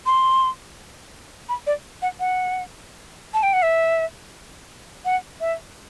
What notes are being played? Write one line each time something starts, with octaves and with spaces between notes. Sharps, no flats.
C6
B5
D5
F#5
F#5
A5
G5
F#5
E5
F#5
E5